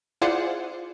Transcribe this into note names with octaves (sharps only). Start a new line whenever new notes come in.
E4 F4 G#4 C5 D5 F#5